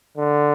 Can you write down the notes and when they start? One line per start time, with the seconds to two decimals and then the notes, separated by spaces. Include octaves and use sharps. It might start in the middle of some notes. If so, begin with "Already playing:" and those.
0.17 D3